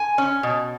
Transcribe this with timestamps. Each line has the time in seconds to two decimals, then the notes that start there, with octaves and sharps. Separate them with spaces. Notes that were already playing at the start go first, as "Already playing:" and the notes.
Already playing: G#5
0.18 C#4
0.43 B2